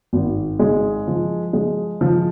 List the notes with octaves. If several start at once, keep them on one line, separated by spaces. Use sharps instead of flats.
G#1
G#3
F3
G#3
F3